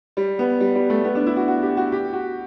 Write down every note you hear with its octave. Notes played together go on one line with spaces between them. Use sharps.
G3
B3
G3
G3
A3
B3
D4
E4
F#4
F#4
G4
F#4
G4
F#4